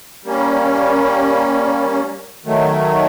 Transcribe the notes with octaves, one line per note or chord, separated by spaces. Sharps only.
G3 A#3 C#4
D#3 F#3 A3